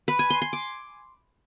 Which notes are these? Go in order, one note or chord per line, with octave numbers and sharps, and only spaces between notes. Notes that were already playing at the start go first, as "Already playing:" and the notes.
B4
G#5
C6
C6
D6